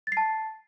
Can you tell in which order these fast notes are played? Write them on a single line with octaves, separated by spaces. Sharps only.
A6 C7 A5